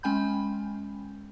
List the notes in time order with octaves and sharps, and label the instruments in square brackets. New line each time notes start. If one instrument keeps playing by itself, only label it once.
[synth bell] G#3 C#4 G5 G#5 B5 G6